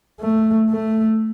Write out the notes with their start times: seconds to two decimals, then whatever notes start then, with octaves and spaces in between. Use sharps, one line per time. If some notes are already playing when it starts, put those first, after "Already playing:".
0.20 A3
0.70 A3